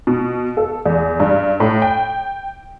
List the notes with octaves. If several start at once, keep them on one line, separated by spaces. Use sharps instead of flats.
B2
A4
E2
G2
A2
G5